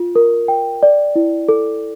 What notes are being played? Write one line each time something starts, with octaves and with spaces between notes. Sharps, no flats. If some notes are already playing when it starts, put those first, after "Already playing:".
Already playing: F4
A#4
G5
D5
E4
A4